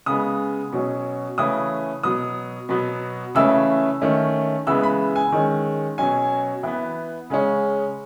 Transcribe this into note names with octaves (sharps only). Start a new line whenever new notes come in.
C#3 G#3 B3 D#6
B2 F#3 C#4
C#3 E3 A3 C#4 D#6
B2 F#3 B3 D#6
B2 F#3 B3
C#3 E3 A3 C#4 E6
D#3 A3 C#4
C#3 E3 G#3 B3 E6
B5
G#5
D#3 G#3 C#4
B2 F#3 C#4 G#5
E3 B3
C#3 G#3 C#4